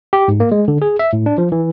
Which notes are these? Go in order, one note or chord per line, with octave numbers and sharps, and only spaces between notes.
G4
G#2
A#3
G#3
D3
G#4
E5
A2
D4
F3
E3